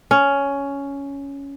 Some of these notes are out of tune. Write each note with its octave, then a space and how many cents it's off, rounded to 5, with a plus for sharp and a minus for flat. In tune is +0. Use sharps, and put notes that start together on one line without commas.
C#4 +10